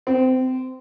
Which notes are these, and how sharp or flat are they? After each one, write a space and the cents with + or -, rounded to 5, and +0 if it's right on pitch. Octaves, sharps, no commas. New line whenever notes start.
C4 -25